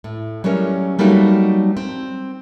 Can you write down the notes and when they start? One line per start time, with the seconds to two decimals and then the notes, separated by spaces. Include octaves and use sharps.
0.04 A2
0.44 F#3 G3 A3 C#4 A#4
0.99 F#3 G3 A3 A#3 D#4 F#4
1.77 C4